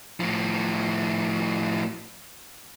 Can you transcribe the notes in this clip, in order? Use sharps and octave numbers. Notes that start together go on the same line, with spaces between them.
A2 F3